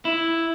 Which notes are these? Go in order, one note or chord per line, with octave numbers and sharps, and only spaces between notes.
E4